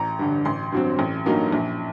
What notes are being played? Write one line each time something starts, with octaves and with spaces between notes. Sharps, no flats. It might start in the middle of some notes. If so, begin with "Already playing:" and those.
Already playing: A1 A#5
G2 D3
A1 C6
G2 F#3 C4
A1
G2 F#3 A#3 D#4
A#1